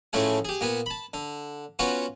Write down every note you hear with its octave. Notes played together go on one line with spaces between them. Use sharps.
A2 C#3 E3 F3 A3 G#4
G4 G#4
A#2 B3 G#5
A5 B5
D3
B3 C#4 F4 F#4 B4